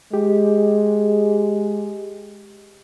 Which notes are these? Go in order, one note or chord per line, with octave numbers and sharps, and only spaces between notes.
G#3 G4